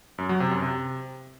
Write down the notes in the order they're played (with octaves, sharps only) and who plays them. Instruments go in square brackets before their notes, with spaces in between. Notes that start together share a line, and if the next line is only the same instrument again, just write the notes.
[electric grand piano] F#2
F#3
C3
F#2
C3